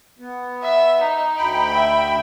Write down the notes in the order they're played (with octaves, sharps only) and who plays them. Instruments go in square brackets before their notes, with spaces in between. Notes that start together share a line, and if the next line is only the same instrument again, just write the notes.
[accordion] B3
[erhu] E5
D#4
[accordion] D2 G5 B5
[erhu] E5